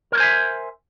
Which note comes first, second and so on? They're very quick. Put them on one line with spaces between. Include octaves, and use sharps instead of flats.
A#4 C#5 C5 G#5 E5